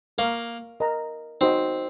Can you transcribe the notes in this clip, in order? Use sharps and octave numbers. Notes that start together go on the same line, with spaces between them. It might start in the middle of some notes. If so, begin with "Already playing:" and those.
A#3 A#4 F5 A#5 C#6
A#4 D#5 A#5
C4 D#4 F#4 C5 D#5